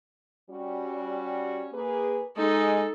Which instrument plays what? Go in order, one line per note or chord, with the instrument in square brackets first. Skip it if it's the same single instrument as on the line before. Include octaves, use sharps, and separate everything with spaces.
[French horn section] G3 C#4 F#4
A#3 G#4 B4
[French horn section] G#3 [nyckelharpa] D#4 A4